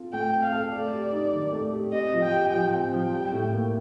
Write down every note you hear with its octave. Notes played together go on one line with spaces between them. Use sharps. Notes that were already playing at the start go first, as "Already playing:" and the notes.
Already playing: C4 F4 A4
A3 G5
C4
F5
A4
A3 D5
G4
D#4
D#3
A3
G4
C4 D#5
F3
G5
G4
F3 G5
C4
G5
F3
G3
A2
A#3